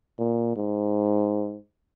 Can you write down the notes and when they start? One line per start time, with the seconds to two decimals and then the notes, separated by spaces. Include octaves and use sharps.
0.19 A#2
0.56 G#2